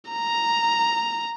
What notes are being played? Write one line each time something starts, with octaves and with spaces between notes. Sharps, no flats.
A#5